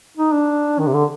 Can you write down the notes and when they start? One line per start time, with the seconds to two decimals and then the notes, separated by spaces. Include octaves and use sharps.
0.17 D#4
0.32 D4
0.79 D#3
0.87 C3
0.93 D3